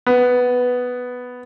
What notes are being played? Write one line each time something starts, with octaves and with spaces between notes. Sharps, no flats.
B3